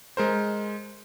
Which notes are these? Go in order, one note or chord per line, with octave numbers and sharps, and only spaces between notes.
G#3 A#4 C5